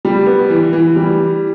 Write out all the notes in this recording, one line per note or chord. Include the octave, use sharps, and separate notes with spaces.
G3
B3
E3
E3
G3